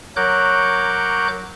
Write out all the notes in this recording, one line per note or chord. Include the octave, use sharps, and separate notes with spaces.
F#3 A#4 C#5 D6 F#6 G6